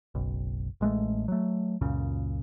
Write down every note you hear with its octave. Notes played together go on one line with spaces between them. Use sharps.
F#1 B1
A1 G#3 A3
F#3 A3
C#2 F#2 A#2 C#3